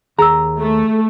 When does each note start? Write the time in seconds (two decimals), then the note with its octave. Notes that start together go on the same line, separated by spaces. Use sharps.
0.18 D#2 G#4 A#5 E6
0.60 A3